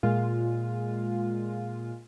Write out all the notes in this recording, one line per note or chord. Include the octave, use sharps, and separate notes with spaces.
A#2 G#3 F4